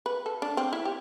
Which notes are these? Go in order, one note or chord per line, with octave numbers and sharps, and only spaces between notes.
B4
A4
D4
C4
E4
G4